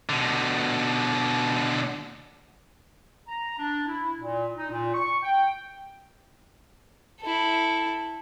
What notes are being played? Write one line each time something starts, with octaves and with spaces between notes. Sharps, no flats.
B2 D3
A#5
D4
E4
A#2
D#4
A#2
C#6
G5
E4 A4